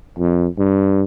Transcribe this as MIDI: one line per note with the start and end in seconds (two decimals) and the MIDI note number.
0.19 0.47 41
0.58 1.03 43